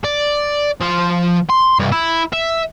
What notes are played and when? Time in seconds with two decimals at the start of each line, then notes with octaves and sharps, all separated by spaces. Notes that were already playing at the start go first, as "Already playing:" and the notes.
0.04 D5
0.81 F3 C6
1.50 C6
1.80 C2 G2
1.92 E4
2.33 E5